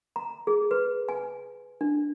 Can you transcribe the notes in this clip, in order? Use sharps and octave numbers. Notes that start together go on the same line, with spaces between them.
A#5
G#4
B4
G#5
D4